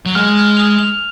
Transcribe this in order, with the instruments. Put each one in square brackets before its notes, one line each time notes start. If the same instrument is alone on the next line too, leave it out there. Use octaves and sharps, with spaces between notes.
[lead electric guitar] F#3
[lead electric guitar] G#3 [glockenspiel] F6
[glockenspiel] F6
F7
F7